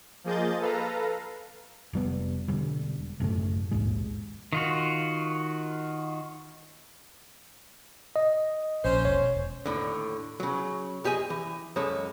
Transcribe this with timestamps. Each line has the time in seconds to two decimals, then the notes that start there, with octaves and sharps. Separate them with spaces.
0.24 F3 A#3 G#4 D#5 G6 A6
0.60 A4 B4 F5 A#5
1.93 F1 G3 B3
2.48 E1 D3 G3
3.20 A1 F#2 C#3 A3
3.71 A#1 D#2 G#2 G#3
4.53 D#3 F4 F#4
8.16 D#5
8.85 A#1 C#4 C5
9.05 E1 C#5
9.66 D#2 A2 D3
10.40 C#3 F#3
11.04 F#2 G4 G#4 D#5 G#5
11.30 E3
11.76 C#2 F#2 G#3 C#4 A4 C#5